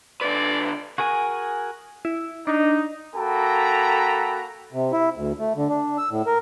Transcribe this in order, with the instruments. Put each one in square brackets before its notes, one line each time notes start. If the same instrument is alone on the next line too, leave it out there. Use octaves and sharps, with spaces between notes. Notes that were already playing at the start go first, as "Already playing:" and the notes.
[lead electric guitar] D3 B4 [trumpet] D5
[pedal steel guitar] F#4 G#4 A#4 G#5
[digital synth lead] E4
[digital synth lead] D4 [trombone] D#4
[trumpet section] A#3 F#4 A4 G5 A#5 B5
[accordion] C3
E4
D2
A3
D3
D4
E6
A2
A#4